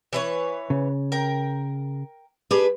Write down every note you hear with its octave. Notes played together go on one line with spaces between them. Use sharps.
E3 B4 C#5
C#3
A#4 G5
D4 G4 G#4 B4